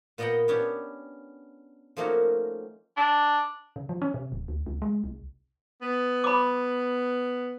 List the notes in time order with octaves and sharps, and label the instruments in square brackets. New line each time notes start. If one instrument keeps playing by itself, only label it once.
[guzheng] A#2 B3 D#5 F#5 G5 A#5
B3 C#4 D4 G4
F3 A3 A#3 C#4 D#4 F#4
[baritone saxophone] D4
[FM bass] C#3
F3
C#4
C3
D1
D2
C#2
G#3
C2
[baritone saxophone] B3
[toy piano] B5 D6